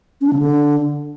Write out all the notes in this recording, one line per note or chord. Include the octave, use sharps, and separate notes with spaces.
C#4
D4
C#3
D3